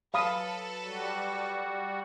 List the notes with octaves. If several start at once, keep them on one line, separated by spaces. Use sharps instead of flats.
F#3 A4 B4 F5 B5 D#6
G3 F#4